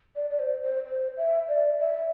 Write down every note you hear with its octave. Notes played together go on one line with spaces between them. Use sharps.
D5
D5
C5
C5
C5
E5
D5
E5